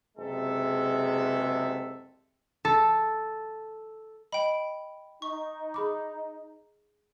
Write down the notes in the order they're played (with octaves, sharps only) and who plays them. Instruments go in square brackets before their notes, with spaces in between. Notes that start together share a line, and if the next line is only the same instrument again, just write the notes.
[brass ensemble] F#1 C3 G#3 A4 E5
[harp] A4
[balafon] D#5 [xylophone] G5 B5
[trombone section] D#4 [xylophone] C#6
[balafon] G#4 B5 D6